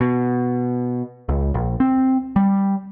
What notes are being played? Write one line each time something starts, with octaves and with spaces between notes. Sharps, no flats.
B2
C#2
A#1
C4
G3